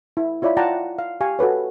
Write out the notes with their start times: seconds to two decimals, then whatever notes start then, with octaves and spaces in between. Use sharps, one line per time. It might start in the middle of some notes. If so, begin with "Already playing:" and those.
0.17 E4
0.42 E4 F4 C#5 D5 E5 B5
0.57 F4 D5 F#5 G5 A5 A#5
0.99 F5
1.21 G4 F5 G#5 C#6
1.39 F#4 A4 B4 C#5